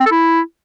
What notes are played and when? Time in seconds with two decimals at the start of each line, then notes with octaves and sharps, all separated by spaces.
0.01 C4
0.06 A4
0.12 E4